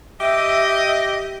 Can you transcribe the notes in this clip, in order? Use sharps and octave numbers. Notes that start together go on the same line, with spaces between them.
G4 D#5 E5